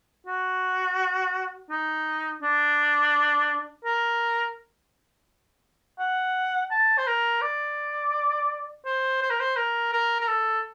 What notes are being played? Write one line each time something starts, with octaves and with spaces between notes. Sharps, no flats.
F#4
D#4
D4
A#4
F#5
A5
C5
A#4
D5
C5
C5
A#4
C5
A#4
A#4
A#4
A4